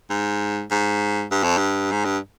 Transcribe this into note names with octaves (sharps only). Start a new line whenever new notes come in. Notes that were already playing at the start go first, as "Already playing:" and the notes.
G#2
G#2
G2
F2
G2
G#2
G2